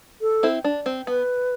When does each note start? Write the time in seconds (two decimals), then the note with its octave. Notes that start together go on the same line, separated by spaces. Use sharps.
0.21 A4
0.43 C4 E4
0.64 D4
0.86 C4
1.07 B3 B4